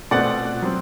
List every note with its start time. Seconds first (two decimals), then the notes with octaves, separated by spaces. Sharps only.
0.11 B2 A3 C4 D5 F#5
0.62 F#3 C4